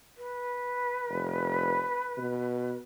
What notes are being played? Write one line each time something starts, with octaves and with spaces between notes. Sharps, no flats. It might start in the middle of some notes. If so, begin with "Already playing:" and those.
B4
F1
B2